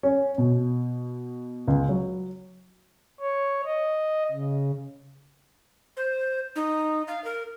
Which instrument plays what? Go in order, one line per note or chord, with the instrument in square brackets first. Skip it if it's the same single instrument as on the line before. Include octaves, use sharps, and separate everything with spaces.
[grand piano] C#4
B2
C#2
F#3
[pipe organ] C#5
D#5
C#3
[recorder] C5
D#4
F5
A#4